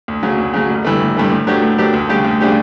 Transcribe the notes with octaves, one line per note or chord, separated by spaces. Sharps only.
D2
C#3 F#3
D2
C#3 F#3
A1
G2 E3 A3
A1
G2 E3 A3
A2
F#3 A3 D4 G4
A2
F#3 A3 D4 G4
D2
C#3 G3 D4 G4
D2
C#3 G3 D4 G4